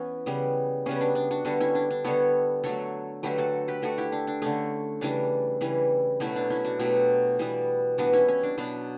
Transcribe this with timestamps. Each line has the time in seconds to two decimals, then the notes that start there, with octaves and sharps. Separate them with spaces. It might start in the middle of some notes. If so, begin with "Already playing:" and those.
Already playing: E3 B3 C#4
0.26 C#3 G3 B3
0.86 C#3 G3 B3 C#4
1.01 D4
1.15 D4
1.31 D4 F#4
1.45 D3 G3 B3 D4
1.60 C#4 E4
1.75 D4
1.91 D4
2.04 D3 G3 B3 A4 C#5
2.64 D3 F#3 A3 A4 C#5
3.23 D3 F#3 A3 G4 B4
3.38 F#4 A4
3.68 G4 B4
3.82 D3 A3 F#4 A4
3.98 E4 G4
4.12 D4
4.27 D4
4.42 D3 A3 C#4
5.01 C#3 E3 G3 D4
5.61 C#3 E3 G3
6.20 B2 F#3 A3 C#4 E4
6.36 D4
6.50 C#4 E4
6.64 D4 F#4
6.79 B2 F#3 A3 E4 G4
7.39 E3 G3 B3
7.98 E3 G3 B3 D4 F#4
8.13 C#4 E4
8.28 C#4
8.43 D4
8.58 B2 F#3 B3 D4